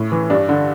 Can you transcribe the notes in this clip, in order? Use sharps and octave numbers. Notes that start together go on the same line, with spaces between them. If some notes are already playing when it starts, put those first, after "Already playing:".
Already playing: A2
E3
G2 D4
D3